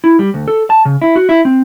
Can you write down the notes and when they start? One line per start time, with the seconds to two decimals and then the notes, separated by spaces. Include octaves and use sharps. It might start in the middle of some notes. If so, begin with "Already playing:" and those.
0.04 E4
0.19 G3
0.34 D2
0.48 A4
0.70 A5
0.85 C#3
1.02 E4
1.16 F#4
1.29 E4
1.45 C4